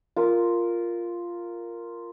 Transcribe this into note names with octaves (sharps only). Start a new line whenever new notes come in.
F4 A#4